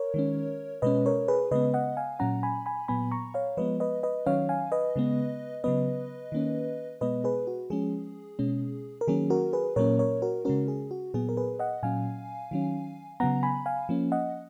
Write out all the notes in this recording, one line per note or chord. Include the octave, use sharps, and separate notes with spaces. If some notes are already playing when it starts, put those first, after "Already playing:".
Already playing: A#4 C#5
D#3 G#3 C#4
B2 G#3 C#4 B4 D#5
A#4 C#5
G#4 B4
C#3 G#3 B3 B4 D#5
D#5 F#5
F5 G#5
A#2 F#3 C#4 F#5 A#5
G#5 B5
G#5 B5
A#2 F#3 B3 G#5 B5
A#5 C#6
C#5 F5
F3 G#3 B3 B4 D#5
B4 D#5
B4 D#5
D#3 F#3 C#4 C#5 F5
F5 G#5
B4 D#5
C#3 G#3 B3
C#3 F#3 B3 B4 D#5
D#3 A#3 C#4
B2 G#3 B3 B4 D#5
G#4 B4
F#4
F3 G#3 C#4 G#4
B2 G#3 C#4
A#4
D#3 F#3 A#3 C#4 G#4
F#4 A#4
G#4 B4
A#2 F#3 A#3 C#4 A#4 C#5
A#4 C#5
F#4 A#4
C#3 G#3 C#4 F#4 A#4
G#4
F#4
A#2 F#3 B3 G#4
A#4
G#4 B4
D#5 F#5
A#2 F#3 C#4 F5 G#5
D#3 F#3 C#4
C#3 F#3 B3 F#5 A#5
G#5 B5
F5 G#5
F3 A#3 C#4
D#5 F#5